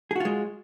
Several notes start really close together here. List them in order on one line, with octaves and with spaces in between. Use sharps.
G#4 F#4 F4 G#3